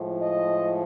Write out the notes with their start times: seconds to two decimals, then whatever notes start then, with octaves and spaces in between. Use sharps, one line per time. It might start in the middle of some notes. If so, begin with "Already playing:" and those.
Already playing: A2 F3 G#3
0.20 D#5